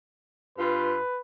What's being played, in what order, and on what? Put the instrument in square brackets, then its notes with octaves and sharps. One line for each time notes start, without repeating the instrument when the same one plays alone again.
[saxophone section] G2 F4 [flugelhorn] B4